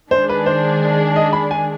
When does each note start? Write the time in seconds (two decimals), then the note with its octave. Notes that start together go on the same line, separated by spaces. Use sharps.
0.11 D#3 G#3 D4 G#4 C5
0.29 B4
0.46 C5
1.16 D#5
1.33 B5
1.51 G#5